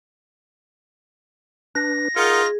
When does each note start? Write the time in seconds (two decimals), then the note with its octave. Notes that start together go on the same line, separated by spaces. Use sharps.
1.75 D4 B4 A#6
2.16 D#4 F4 G#4 A#4 F#5